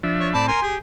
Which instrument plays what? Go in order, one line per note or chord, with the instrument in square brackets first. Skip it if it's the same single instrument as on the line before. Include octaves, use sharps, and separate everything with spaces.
[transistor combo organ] F3 D4 E5
[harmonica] C#5
[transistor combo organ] A2 C4 [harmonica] D5 A5 B5
[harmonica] A#4 G#5 C6
[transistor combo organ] G4 [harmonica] G#4